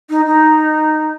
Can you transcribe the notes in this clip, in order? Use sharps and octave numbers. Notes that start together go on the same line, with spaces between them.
D#4
D#4